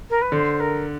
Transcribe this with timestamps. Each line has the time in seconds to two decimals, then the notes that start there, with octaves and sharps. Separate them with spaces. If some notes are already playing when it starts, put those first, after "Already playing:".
0.09 A#4
0.21 B4
0.32 D3 C5
0.59 A#4